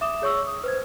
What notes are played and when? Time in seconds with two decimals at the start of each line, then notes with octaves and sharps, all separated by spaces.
0.01 E5 D6 D#6 E7
0.22 G#4 C#5 C#6 E6
0.47 D#6
0.64 B4 C5 G#6